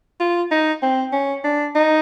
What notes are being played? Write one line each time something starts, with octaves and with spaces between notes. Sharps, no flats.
F4
D#4
C4
C#4
D4
D#4